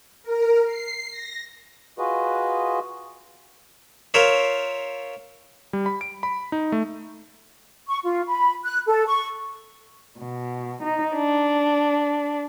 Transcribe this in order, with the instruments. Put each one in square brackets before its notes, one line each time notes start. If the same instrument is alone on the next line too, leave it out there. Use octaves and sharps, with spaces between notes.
[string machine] A#4
C7
A#6
[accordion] F4 F#4 G#4 B4 D#5
[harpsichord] F4 A#4 C5 C#5 E5
[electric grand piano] G3
B5
D7
B5
D#4
A3
[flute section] C#6
F4
B5
F#6
A4
C#6
[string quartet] B2
D#4
D4